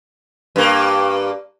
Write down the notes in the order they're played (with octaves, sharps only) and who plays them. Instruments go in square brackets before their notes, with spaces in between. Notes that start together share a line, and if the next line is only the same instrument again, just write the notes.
[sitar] G2 A#3